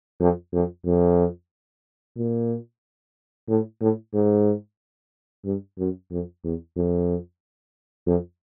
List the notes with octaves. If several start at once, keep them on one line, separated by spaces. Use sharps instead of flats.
F2
F2
F2
A#2
A2
A2
G#2
G2
F#2
F2
E2
F2
F2